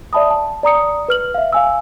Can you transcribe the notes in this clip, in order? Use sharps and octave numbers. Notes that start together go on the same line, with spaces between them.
D5 E5 A5 B5 D#6
A5
D5 A#5 D#6 C#7
B4 F6 F#7
E5 F5
F5 G#5 E6